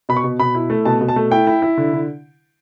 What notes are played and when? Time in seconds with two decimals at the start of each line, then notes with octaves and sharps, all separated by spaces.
0.09 B2 B5
0.17 C#6
0.24 B2
0.39 B2 B5
0.55 E4
0.70 A3
0.85 B2 A5
1.01 B2
1.08 A5
1.16 A3
1.31 E4 G5
1.47 E4
1.62 E4
1.77 D3
1.93 D3